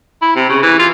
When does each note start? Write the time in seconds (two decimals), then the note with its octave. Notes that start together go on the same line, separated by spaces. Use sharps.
0.22 E4
0.35 C3
0.49 C#3
0.62 E3
0.79 F4